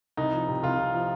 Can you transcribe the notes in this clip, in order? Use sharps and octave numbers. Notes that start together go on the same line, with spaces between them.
C2 D#4
F3
C3
C2 F4
C2
F3